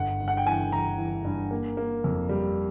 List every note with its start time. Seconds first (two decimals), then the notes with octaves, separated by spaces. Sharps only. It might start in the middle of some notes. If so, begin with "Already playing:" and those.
Already playing: G1 F#5
0.20 G2
0.28 F#5
0.37 G5
0.46 E3 G#5
0.72 E3 A#5
0.98 E3
1.25 G2
1.51 A#3
1.77 A#3
2.04 F2
2.29 G3